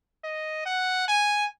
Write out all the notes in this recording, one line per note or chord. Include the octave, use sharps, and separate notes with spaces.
D#5
F#5
G#5